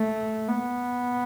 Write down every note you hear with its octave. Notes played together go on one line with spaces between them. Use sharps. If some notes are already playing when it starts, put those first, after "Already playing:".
Already playing: A3
B3